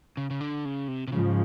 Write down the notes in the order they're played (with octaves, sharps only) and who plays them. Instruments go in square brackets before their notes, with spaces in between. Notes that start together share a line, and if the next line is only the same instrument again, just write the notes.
[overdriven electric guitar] C#3
C#3
D3
C#3
C3
C3
[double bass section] G#2 F3 G#3 [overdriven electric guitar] C#3